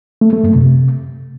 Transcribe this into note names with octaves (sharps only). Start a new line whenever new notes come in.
A3
A3
F#2
C3